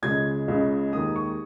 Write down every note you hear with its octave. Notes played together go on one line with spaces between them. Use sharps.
C#2 C#3 G#3 G#6
C#2 C#3 G#3
D#2 D#3 G#3 D#6
C#6